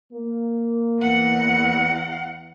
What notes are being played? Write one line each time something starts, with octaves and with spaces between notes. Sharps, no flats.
A#3
E2 F#5